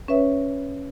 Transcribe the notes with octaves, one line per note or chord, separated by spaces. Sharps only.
C#4 B4 C#5 E5